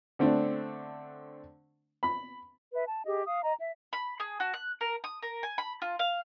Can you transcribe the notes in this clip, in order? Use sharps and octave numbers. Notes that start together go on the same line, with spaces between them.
D3 A3 C4 D4
B5
B4 E5
A5
G4 G#4 D#5
F5 D#6
D#5 A#5
E5
B5
G#4
F#4
F#6
A#4
D#6
A#4
G#5
B5
F4
F5